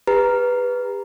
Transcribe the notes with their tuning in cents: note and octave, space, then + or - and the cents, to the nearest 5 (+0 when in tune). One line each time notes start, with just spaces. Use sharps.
G4 +45 B4 +0 A#5 +0